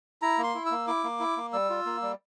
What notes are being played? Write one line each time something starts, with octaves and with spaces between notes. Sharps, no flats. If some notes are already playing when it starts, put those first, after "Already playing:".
E4 A#5
A#3
C6
E4
A#3 E6
E4 D6
A#3
E4
A#3
G3 E6
F4
A#3
G3